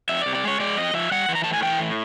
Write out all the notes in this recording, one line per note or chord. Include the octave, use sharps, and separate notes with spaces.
F2 E5
C3 D5
D5
G#3 C#5
G#3 D5
F2 D#5
F3 E5
G3 F#5
E3
A#5
A2 A5
G#5
E3 G5
A2